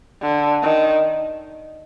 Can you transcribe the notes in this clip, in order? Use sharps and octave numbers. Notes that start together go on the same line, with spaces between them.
D3
D#3